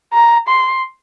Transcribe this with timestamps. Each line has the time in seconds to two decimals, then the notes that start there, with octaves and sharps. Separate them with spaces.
0.13 A#5
0.48 C6